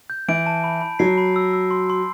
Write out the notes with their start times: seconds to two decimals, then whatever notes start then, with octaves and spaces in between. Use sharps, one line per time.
0.10 G6
0.28 E3 D7
0.46 A5
0.64 B5
0.81 B5
0.99 F#3 C7
1.18 B5
1.36 E6
1.54 E6
1.71 C6
1.90 C6